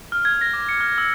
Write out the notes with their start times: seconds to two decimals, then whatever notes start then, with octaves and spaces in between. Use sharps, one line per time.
0.12 F6
0.25 G#6
0.41 A#6
0.53 D6
0.69 C#7
0.81 F6
0.98 E6